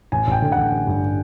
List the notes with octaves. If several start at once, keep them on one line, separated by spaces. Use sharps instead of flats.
A1 G#5
A1 G5
D3
A1 F#5
A1
G2